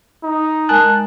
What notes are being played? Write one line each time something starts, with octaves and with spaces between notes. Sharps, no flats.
D#4
G#3 A#4 G#5 A5 F#6